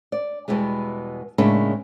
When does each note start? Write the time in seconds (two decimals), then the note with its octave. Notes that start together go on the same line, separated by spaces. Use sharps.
0.12 D5
0.48 E2 B2 E3 G3 G#3
1.38 A2 C#3 G#3 A#3 D4 E4